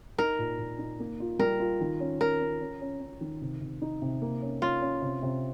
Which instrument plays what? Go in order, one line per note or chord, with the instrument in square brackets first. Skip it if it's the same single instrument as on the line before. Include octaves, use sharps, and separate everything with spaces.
[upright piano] D#4 [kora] A#4
[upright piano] A#2
A#2
D#4
A#3
F4
[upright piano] G3 [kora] A#4
[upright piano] F4
D#3
C#4
[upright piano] C#4 [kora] A#4
[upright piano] C#4
C#4
C#4
C#4
D#3
C3
C3
D#4
C3
A#3
C#4
[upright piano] C#4 [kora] F4
[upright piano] C#4
C3
C3